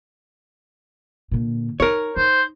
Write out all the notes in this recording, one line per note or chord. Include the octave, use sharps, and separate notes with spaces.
A#2 D3
D#4 A#4 C#5
D#4 C5